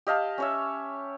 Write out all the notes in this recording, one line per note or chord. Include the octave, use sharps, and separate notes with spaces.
G4 D#5 F5 A5
C#4 C#5 E5